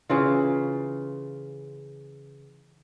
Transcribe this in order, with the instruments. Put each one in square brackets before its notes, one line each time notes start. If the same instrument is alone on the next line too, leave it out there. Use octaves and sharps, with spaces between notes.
[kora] C#3 E3 F4